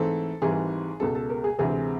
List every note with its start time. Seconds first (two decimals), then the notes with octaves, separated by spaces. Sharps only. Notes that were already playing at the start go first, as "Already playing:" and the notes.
Already playing: G#2 E3 A3 C4 A4
0.42 G#1 G#2 E3 G3 G#4
1.00 C#2 B2 G#3 A4
1.15 A4
1.30 A#4
1.44 G#4
1.59 D2 C3 E3 G#3 C4 G#4